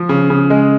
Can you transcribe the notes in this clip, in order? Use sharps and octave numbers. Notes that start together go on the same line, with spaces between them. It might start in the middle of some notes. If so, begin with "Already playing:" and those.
Already playing: F3
C#3
C#3
G#3